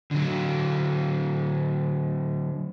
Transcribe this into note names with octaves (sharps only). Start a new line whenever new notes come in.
D3 F#3